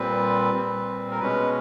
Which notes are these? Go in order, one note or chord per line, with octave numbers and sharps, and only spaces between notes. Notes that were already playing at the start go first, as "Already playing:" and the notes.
Already playing: A#2 G3 C4 B4
A#2 G3 C4
A#4
B2 G#3 C#4 B4